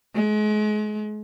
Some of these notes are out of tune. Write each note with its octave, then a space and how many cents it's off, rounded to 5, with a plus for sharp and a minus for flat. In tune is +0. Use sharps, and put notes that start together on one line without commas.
G#3 +35